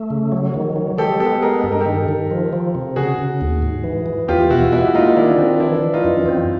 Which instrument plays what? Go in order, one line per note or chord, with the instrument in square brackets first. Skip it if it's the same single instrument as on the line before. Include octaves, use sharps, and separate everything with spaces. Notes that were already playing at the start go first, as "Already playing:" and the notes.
Already playing: [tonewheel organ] A3
C#3
F#3
D#3
F#3
[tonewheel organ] G#3 [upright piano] G4 A4
[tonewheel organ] B3 [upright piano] G4 A4
[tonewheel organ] G#3 [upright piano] G#4 A#4
[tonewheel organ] G2 [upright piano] A4
[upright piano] A#4
G4 A4
[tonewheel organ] D#3
D#3
F3
F3
C3
[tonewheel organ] C#3 [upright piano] F#4 G#4
[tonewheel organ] C#3
D#2
G#2
E3
E3
[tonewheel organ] E2 [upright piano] F4 G4
[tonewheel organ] B2 [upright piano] E4 F#4
[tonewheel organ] G#3 [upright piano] E4 F#4
[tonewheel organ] A#3 [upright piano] D#4 F4
[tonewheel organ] D#3 [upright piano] D4 E4
[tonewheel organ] D#3 [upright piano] C4 D4
[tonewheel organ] E3 [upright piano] D4 E4
[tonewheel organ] E3
[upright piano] D#4 F4
[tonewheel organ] F#2
C4